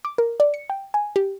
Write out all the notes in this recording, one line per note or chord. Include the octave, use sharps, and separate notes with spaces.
D6
A#4
D5
C#7
G5
G#5
G4